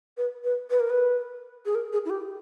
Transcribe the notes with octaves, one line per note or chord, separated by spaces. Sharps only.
B4
B4
B4
A#4
B4
G#4
A#4
G#4
E4
G4